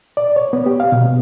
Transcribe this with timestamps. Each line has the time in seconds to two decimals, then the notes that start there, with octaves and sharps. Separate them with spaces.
0.17 D5
0.36 C#5
0.53 B3
0.66 G4
0.80 F5
0.92 B2
1.06 B3